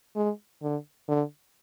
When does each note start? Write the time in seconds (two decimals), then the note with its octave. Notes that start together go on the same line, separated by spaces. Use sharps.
0.16 G#3
0.62 D3
1.08 D3